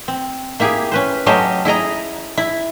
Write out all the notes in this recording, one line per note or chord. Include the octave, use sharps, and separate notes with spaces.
C4
A#3 E4 G4 G#4
C#4 B4 C5
F#3 A3 C#4 G4 C5 D#5
E4 G#4 D#5 A#5
E4